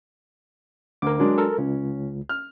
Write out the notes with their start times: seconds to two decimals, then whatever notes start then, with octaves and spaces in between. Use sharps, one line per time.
1.02 D2 A#4 D6
1.19 F#3 G#3 D4
1.38 A4 A#4
1.58 C#2 C#4
2.29 F6